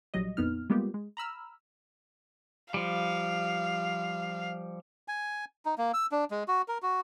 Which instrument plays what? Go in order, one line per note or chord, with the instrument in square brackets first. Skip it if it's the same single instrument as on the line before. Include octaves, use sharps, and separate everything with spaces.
[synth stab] A#1 F#3 G3 D#5
A#1 F2 B3 D#4 F6
G3 G#3 A#3 B3 F4 G4
G#3
A#5 B5 E6 F6
[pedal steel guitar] F3 G3 [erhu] F5
[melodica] G#5
D#4
A#3
E6
D4
G#3
F#4
A#4
F#4